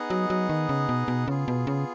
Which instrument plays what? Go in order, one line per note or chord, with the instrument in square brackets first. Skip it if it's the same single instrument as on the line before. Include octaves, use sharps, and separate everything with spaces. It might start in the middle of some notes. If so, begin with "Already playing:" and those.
Already playing: [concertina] B3 D#4 G#4 D#5 F#5
[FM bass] F#3
F#3
D#3
C#3
B2
B2
[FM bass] C#3 [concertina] B3 F4 G#4
[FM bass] B2
C#3